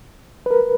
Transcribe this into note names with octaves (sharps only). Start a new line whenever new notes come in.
B4
A#4